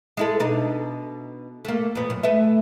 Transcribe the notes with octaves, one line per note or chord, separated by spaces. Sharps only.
G#3 E4 A4
B2 D4 D#4
A3 A#3
F2 A#2 B3
F#2
A3 B4 E5